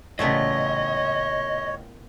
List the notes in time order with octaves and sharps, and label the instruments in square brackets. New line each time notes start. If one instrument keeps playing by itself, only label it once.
[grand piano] A1 C#3 [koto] A#2 A3 B3 [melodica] C#5 [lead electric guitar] D#5